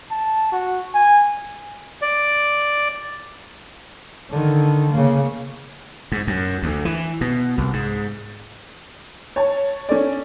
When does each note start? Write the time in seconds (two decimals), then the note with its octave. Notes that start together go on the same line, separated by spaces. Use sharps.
0.11 A5
0.52 F#4
0.95 G#5
2.02 D5
4.30 D3 D#3
4.92 C#3 A#3
6.12 G#2
6.27 F#2
6.63 D2
6.85 E3
7.21 B2
7.58 C2
7.73 G#2
9.36 C#5 A5
9.89 C#4 A4 D5